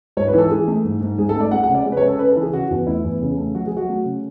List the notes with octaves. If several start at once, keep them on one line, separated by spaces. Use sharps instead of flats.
G#2 C#5
B4
E3 A4
E3 G#4
A3
G#2
G#2
G#2 G#4
A4
A3
D5
G#3 F#5
F#5
C#3
D5
G#3
B4
C#5
C#3 A4
C#3 B4
A4
E3
G#4
C#3 F#4
E2
A3 E4
E2
C#3
A3
F#3 F#4
G#4
F#3
F#4
A3
C#3